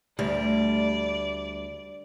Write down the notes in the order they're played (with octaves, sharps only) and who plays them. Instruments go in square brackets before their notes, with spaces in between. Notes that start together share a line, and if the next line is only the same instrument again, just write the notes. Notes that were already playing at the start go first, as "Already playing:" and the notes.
[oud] D2 G3 [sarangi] D5